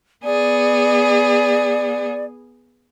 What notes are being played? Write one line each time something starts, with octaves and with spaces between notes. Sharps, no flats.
B3 G#4 D5